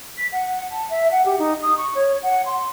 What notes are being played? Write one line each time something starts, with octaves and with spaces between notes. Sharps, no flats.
B6
F#5
A5
E5
F#5
G4
D#4
D#6
C#6
C#5
F#5
C6